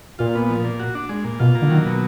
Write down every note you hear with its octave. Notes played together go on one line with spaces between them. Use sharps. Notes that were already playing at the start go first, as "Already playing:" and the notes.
A#2 F4
B3
F3
A#2
F#4
D4
G#3
A#2
B2 F4
A#3
D3
D#3 F#3
B2